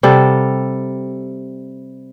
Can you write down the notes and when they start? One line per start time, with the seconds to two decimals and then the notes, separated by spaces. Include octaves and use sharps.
0.03 C3 G3 A4 F#5